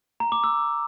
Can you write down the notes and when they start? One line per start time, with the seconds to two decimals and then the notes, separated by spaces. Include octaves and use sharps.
0.20 A#5
0.32 D6
0.44 E6